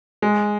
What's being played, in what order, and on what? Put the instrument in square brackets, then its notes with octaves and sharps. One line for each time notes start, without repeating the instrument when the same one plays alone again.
[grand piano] G#3